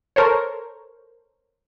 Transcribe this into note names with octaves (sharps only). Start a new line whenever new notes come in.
A4 A#4 C5 C#5